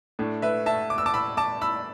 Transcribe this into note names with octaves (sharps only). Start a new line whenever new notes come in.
A2 A3 D4
B4 E5
E5 A5
D6
E6
A5 D6
B5 E6
A5 D6
B5 E6